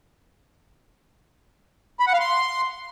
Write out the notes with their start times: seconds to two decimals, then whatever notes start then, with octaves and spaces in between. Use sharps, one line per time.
2.00 B5
2.07 F#5
2.13 F5
2.20 C6